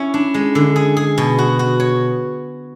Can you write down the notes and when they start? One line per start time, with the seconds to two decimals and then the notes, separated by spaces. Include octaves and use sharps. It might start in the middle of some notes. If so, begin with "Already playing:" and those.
Already playing: C#4 E4
0.14 D4
0.34 G#3
0.55 D3
0.76 G#4
0.97 G#4
1.18 B2
1.38 F#4
1.59 F#4
1.80 C#5